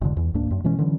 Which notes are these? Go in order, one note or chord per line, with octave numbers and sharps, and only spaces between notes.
F1 G#2 D3
E2
C#2 G#2 A#3 D4
F#2
B2 E3 G#3 C#4
D3 E3 F#3 C#4